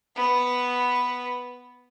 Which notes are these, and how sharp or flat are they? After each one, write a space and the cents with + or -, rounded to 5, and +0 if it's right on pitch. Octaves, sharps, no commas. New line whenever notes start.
B3 +0 B4 +0